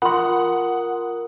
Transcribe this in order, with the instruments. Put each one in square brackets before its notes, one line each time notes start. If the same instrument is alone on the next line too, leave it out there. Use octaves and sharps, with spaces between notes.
[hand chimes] F4 A#4 D#6 [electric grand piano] F#5 [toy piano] B5 C6